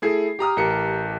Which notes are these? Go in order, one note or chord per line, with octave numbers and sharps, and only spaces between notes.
A3 E4 G#4 G#6 C7
G4 A#5 D#6 F6
A1 G4 A#4 C#7